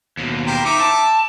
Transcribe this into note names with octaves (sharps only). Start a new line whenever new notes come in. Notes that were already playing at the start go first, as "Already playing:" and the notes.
D#2 B2
G4 A#4 C5
D#4 E5 D6
A5